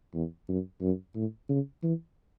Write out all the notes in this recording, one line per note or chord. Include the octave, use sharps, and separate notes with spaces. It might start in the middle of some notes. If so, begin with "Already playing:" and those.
E2
F#2
F#2
A2
C#3
E3